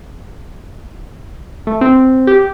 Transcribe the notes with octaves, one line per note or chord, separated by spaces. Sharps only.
A3
C4
G4